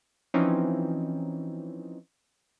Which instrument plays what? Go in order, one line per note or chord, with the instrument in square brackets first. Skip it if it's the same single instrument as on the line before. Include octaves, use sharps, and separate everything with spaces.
[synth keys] E3 F3 C4 C#4 D#4